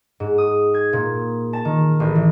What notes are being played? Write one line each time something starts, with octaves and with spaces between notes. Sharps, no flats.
G#2
D#6
G#6
A#2
A5
D#3
A1
E3